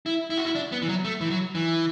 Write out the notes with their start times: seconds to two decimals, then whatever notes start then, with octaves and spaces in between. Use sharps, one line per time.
0.06 E4
0.30 E4
0.38 F#4
0.45 E4
0.55 D4
0.72 B3
0.82 E3
0.89 F#3
1.05 A3
1.21 E3
1.30 F#3
1.55 E3